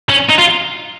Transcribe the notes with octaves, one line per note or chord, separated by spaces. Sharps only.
C#4
D#4
F4